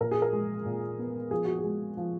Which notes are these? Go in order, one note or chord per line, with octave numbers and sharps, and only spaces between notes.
A#2 A#4
G#4
A#4
G#3
A#2
B3
F3 G#4
F#4
G#4
G#3
F3